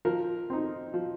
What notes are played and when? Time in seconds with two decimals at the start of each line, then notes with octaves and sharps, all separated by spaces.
0.05 F3 A#4
0.50 C4 D#4
0.94 F3